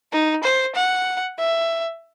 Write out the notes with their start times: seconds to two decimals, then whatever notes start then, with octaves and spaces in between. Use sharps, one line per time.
0.12 D#4
0.44 C5
0.75 F#5
1.39 E5